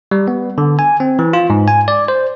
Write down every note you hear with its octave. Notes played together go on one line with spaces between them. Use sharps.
G3
B3
D3
G#5
C4
E3
F4
G#2
G#5
D5
C5